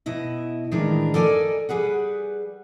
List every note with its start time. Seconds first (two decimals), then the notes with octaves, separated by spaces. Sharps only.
0.06 B2 E4 D#5
0.71 A2 D#3 E3 G#3 D4 A#4
1.14 A4 A#4 D5 D#5 G#5
1.69 G3 G#4 B4 F#5